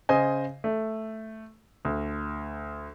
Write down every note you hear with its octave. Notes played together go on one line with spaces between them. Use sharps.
C#3 C5 D#5 G#5
A3
D2